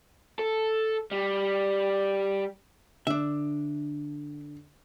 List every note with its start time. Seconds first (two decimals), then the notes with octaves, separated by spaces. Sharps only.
0.39 A4
1.11 G3
3.07 D3 D4 E5